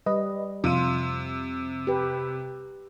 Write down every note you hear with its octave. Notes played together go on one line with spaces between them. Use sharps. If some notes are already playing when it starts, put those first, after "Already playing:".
G3 B4 D#5
F2 C3 F4 D#7
G4 B4